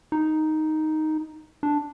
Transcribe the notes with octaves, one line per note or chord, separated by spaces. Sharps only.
D#4
D4